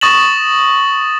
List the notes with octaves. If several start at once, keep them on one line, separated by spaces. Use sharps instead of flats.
C#6 D#6 A6 A#6 E7 F#7